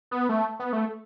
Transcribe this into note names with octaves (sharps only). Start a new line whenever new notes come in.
B3
A3
B3
A3